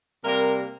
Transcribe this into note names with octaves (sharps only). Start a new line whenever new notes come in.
C3 G3 A#3 A#4